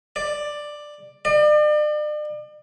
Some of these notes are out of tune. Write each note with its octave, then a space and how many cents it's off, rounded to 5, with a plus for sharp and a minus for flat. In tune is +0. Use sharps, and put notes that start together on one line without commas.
D5 +10
D5 +40